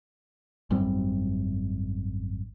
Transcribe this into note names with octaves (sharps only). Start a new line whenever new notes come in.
G#1 F#2 G3 C4